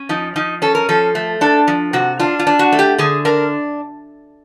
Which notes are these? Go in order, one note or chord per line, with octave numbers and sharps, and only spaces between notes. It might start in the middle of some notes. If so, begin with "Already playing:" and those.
Already playing: C#4
F3 D#4
F3 D#4
C#4 A4
A#4
F3 A4
A3
D4 A4
F3
C3 F#4
D4 F4
F4
D4
F#4
A3
G4
D3 G#4
D4 A#4